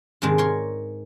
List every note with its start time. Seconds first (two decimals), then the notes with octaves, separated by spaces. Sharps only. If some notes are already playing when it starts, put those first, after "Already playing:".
0.22 G#2 C3 D#3 G#3 D4
0.38 A#4 C#5 C6